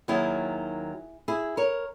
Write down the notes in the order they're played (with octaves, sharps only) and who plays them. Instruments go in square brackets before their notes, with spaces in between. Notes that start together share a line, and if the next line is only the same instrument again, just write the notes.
[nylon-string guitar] D#2 D#3 F#3 E4 G#4
E4 G#4
A#4 C#5